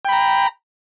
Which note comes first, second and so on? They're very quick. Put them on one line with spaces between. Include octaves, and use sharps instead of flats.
G5 B5 A#5